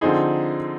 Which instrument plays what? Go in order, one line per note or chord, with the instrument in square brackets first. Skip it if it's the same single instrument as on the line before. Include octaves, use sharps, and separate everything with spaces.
[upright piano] D3 F3 C4 D#4 G#4